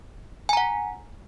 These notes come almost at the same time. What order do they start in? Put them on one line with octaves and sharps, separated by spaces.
G#5 A#5 F#5